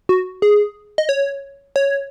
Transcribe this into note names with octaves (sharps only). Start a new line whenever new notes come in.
F#4
G#4
D#5
C#5
C#5